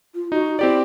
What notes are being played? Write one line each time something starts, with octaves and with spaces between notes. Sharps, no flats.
F4
D#4 F#4
C4 E4 G4 D5